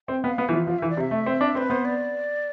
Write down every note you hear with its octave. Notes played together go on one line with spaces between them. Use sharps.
C4 G5
B3 G5
F5
B3
E3 F3 E5
F3 F5
E3 E5
D5
C3
E5
A3
C4
D4
C4 B4
B3 C5
D5